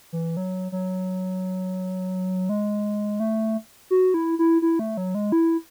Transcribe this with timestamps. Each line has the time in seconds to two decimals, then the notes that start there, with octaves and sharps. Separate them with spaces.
0.13 E3
0.37 F#3
0.72 F#3
2.49 G#3
3.20 A3
3.90 F#4
4.14 E4
4.39 E4
4.62 E4
4.79 A3
4.97 F#3
5.15 G#3
5.32 E4